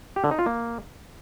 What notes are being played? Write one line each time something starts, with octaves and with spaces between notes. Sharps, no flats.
G4
D3
D#4
F4
A#3